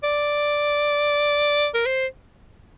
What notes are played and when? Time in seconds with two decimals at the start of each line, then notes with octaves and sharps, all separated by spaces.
0.03 D5
1.74 A#4
1.86 C5